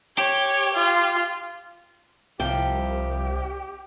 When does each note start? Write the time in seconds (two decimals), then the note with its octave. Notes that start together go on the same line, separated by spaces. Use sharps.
0.18 G4 C#5
0.75 F4
2.40 C2 C3 F3 G4 G5